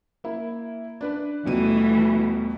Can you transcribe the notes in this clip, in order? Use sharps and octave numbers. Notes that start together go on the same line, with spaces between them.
A#3 E4
D4 B4 D5
D#1 B2 E3 A3 D#7